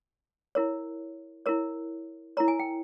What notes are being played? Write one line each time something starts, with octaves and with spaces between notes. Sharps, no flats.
E4 A#4 C#5
E4 A#4 C#5
E4 A#4 C#5 A#5
G#5
G5